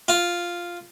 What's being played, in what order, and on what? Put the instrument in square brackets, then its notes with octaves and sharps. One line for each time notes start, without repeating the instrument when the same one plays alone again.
[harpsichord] F4